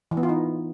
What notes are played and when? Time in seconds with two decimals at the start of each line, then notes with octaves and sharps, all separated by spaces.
0.11 E3
0.17 B3
0.23 F4
0.29 D#4